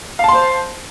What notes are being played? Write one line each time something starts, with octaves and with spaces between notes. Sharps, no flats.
C5 F5 A5 C6